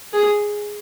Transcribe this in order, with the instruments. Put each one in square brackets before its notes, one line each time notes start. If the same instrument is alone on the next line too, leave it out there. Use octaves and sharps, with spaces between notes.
[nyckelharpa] G#4